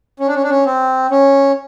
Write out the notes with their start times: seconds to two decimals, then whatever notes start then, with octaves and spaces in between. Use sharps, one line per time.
0.20 C#4
0.27 D4
0.35 C#4
0.43 D4
0.50 C#4
0.66 C4
1.11 C#4